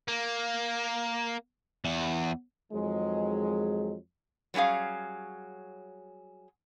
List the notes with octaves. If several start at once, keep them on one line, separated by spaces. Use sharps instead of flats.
A#3
E2
F2 D#3 F#3 G#3
F#3 G3 C#4 G#4 F5